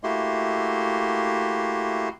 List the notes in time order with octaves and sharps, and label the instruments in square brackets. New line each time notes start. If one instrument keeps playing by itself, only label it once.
[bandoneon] A3 A#3 E4 F#4 G4 C6